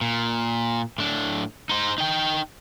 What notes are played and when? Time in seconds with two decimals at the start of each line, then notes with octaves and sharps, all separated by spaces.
0.01 A#2
0.98 A2 D4
1.69 D#4 C5
1.98 D#4 G5